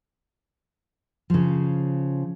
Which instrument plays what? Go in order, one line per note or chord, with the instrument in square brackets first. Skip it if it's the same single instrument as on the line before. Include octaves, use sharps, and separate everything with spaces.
[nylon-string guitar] C#3 F3